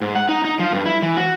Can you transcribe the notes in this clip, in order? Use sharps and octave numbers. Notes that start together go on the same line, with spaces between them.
G#2
F#5
D#4
D#4
F3
G2
E4
E3
F#4